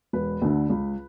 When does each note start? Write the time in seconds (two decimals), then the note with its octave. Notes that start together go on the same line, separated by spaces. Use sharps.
0.13 E1 B4
0.42 D2 D3
0.70 C#2